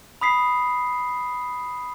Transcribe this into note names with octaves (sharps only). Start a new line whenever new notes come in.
B5 D#6 B6 C7